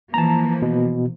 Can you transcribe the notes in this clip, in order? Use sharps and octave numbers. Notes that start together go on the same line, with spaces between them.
E3 F3 A#3 A5 A#5
B2